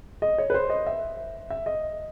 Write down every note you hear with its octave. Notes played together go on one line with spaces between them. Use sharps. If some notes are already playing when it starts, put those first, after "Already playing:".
D#5
C#5
B4
C5
D#5
E5
E5
D#5